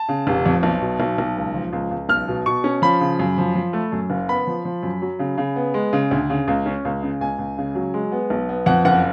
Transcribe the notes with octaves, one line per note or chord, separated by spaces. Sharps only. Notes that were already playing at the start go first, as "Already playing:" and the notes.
Already playing: A5
C#3
F1
F2
B1
B2
B1
B1
C#2
F3
C#2
C#2
B1 F6
B2
B2 C#6
C#4
F3 B5
C#3
F#2
F3
F3
A3
F#2
F#1
B3 B5
F3
F3
F#2
F#3
C#3
C#3
B3
G#3
C#3
D2
C#3
C#2
C#4
C#2
C#3
C#2 G#5
C#2
C#3
F#3
G#3
B3
B1
B3
F2 F#5
F#1 F#5